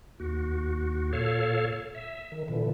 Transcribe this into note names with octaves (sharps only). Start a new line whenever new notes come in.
D#2 F#4
A#2 A4 C#5 F5
E5
D#3
A#2 D3 E3